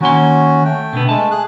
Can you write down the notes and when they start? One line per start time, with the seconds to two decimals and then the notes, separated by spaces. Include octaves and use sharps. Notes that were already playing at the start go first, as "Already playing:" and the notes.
0.01 D#3 A#3 C#4 F#4 C6
0.65 A3 G5
0.93 B2 D3 B3
1.09 G#3 A3 A5
1.31 G#4 F#6